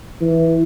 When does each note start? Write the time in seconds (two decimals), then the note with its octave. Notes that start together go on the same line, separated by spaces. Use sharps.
0.21 E3